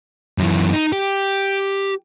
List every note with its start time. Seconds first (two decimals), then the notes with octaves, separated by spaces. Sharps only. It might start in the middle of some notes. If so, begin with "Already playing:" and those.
0.38 F#2 E3
0.73 D#4
0.93 G4